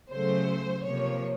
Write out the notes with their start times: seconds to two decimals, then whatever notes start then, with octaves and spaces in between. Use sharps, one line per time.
0.12 C#3 F#3 A3 C5
0.84 C3 F3 A#3 C#5